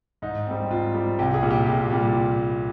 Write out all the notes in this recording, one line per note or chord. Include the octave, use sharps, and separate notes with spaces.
G#2 D#4
G3 C4
G#2 F4
G3 C4
C2 G4
G#4
A#2 G3
G4
C2 F4
A#2 G3